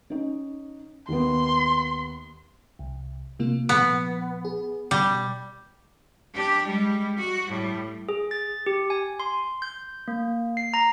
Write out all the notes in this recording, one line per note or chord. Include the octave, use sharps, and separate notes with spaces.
C#4 D#4
D#2 B3 C6
C2
C3 A#3 F4
A#2 F3 B3
G#4
B2 G3
D4 G4
G3 G#3
F#4
A2 G3
G#4
A6
G4
G#5
C6
G6
A#3
C7
A#5